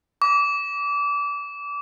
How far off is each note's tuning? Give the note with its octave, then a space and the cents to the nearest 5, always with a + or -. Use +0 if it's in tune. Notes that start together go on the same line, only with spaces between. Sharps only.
D6 -30